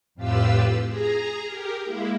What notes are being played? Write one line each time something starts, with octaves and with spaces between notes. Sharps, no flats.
F2 A2 F4 G4 B4 E6
G#4 A#5
G4 A#4
G#3 A#3 E4